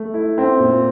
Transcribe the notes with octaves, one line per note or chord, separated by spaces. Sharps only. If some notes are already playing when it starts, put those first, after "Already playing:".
Already playing: A3
E4
C4
A#2